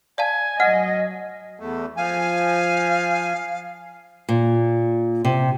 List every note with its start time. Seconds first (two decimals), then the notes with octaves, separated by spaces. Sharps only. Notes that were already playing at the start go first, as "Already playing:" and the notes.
0.18 D5 F5 G#5 A5
0.60 F#3 D#5 F#5 F6
1.60 E2 A3
1.97 F3 F5 G#5
4.29 A#2
5.25 C3